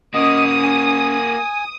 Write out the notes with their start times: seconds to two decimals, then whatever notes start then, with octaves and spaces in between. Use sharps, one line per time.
0.14 A#3 C#4 F#4 D#5 D#6
0.64 G#5